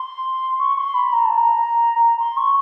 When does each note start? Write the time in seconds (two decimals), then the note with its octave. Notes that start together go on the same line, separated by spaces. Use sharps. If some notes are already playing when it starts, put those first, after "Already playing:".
Already playing: C6
0.59 C#6
0.77 C6
0.94 B5
1.12 A#5
1.25 A5
1.37 A#5
2.01 A#5
2.19 C6
2.36 C#6